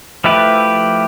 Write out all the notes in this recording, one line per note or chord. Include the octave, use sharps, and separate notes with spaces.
F3 A3 E4 G4 B4